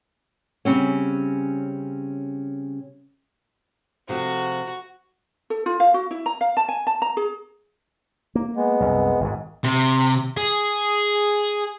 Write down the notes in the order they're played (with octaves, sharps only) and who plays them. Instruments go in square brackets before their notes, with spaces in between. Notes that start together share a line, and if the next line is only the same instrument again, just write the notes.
[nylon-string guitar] C#3 F3 G3 C4 C#4
[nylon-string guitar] C3 F3 A3 [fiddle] F#4
[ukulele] A4
F4
F5
F#4
E4
A#5
F5
A5
G#5
A5
A#5
G#4
[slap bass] A#3
[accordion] G#3 B3
[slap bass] C2 F#2
G#1 G#2
[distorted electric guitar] C3
G#4